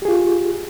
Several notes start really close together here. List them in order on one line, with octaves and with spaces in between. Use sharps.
G4 G#4 F4